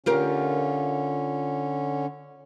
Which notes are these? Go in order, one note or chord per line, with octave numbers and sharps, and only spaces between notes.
D3 C#4 F4 G4 A#4